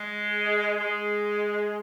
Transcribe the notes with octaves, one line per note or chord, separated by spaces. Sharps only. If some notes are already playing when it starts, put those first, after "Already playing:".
Already playing: G#3
G#3